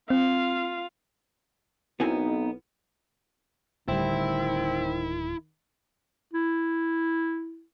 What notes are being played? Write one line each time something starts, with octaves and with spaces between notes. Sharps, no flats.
C4 F4 F5
B1 B3 C4 D#4 E4 A#4 G#5
D1 D2 D#3 G3 C4 E4
E4